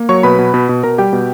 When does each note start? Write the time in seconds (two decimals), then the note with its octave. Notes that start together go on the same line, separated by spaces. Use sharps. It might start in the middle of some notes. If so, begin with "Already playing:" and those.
Already playing: A#3
0.09 F#3 C#5 C#6
0.23 B2 B4 B5
0.39 B2
0.54 B2
0.69 B2
0.83 B2 A#4 A#5
0.98 G3 G4 G5
1.13 B2